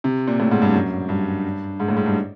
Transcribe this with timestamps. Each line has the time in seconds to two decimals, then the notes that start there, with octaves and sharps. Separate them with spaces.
0.04 C3
0.27 A#2
0.40 A2
0.51 G#2
0.62 G2
0.74 F#2
1.09 G2
1.80 G#2
1.89 A2
1.97 G#2
2.06 G2